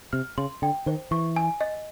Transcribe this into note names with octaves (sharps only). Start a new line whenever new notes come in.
C3 F6
C#3 C6
D3 G5
D#3 C5
E3 C#6
G#5
D#5